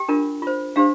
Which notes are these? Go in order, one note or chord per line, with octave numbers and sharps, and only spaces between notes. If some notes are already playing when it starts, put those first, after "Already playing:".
Already playing: G4 G5
D4 F4 A#4
F4 C5
D4 G4 C5 F5